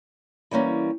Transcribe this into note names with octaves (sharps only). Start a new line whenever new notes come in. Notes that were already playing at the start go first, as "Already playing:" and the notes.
E3 G3 A#3 C#4